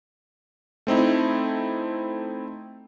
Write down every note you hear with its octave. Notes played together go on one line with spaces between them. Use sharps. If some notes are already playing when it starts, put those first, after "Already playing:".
A3 C4 D#4 E4